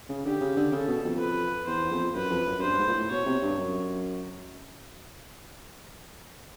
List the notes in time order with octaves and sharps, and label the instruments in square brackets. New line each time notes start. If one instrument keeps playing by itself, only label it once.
[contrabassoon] C#3
[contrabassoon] D3 [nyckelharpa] G4
[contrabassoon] C#3
D3
[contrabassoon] C#3 [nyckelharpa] A4
[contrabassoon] B2
F2
[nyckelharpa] B4
[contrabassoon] E2 [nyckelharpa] C5
[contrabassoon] E2
F2
[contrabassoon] F#2 [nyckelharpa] B4
[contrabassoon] F2
F#2
F#2
[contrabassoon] G2 [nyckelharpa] C5
[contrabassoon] G#2
A#2
A2
[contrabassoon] B2 [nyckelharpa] C#5
[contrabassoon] C3
G2
F#2